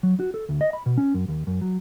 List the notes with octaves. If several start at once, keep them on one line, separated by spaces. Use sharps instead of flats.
F#3
F#4
A4
D2
D#5
B5
B2
C#4
F#2
D#2
F#2
F#3